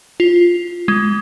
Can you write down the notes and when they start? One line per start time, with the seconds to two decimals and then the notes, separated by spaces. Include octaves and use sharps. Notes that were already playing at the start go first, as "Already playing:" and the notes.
0.20 F4
0.88 G#3